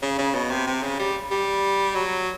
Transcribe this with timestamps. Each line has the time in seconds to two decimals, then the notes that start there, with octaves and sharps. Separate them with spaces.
0.02 C#3
0.18 C#3
0.34 B2
0.51 C3
0.67 C3
0.83 C#3
0.99 G3
1.31 G3
1.95 F#3